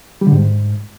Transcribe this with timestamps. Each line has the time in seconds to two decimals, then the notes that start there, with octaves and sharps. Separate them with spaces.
0.21 G3
0.27 D3
0.32 G#2